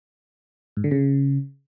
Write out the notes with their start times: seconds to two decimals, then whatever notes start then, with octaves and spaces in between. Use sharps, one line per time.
0.77 G#2
0.84 D3
0.91 C#3